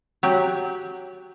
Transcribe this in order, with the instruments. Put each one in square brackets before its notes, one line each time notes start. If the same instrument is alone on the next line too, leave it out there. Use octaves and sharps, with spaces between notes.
[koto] F#3 G4